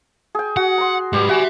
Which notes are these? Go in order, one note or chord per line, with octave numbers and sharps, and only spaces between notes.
G#4 G5
F#4 F#5
A#5 C6
G#2 G3 G4 B4
F#4 E5 G#5